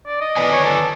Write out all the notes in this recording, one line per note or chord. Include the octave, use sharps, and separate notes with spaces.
D5
D#5
B4 D5 G#5
C#5
A4